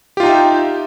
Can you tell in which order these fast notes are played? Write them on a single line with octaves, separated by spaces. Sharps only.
G4 F4 D#4 G5 E5